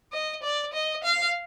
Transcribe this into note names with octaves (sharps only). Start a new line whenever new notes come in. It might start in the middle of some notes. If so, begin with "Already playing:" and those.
D#5
D5
D#5
F5